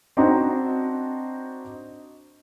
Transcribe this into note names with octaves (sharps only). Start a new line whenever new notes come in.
C4 D4 D#4 F#4 C5 A#5